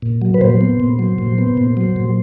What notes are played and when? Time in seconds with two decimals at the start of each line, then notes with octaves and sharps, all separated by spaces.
0.02 A#2
0.22 F#3
0.34 B4
0.41 A#2 C5
0.61 B3
0.80 A#2
0.99 F#3
1.18 A#2
1.38 B3
1.57 A#2
1.77 F#3
1.96 A#2